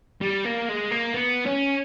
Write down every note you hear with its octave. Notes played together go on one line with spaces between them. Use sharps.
G3
A#3
G#3
A#3
B3
C#4